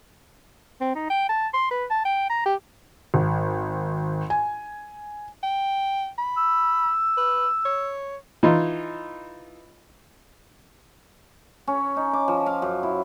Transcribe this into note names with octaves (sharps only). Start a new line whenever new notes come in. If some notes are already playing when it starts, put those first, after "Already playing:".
C4
D#4
G5
A5
C6
B4
A5
G5
A#5
G4
G#1
G#5
G5
B5
E6
B4
C#5
E3 D#4 F4
C#4
D#4
D6
F3
F5
F#2
E4